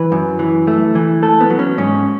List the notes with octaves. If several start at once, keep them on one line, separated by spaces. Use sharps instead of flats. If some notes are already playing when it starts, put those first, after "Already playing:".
Already playing: E3 B4
F#2
E3
A3
E3
A3 A4
B3
F#3
C#4
G#2 C#4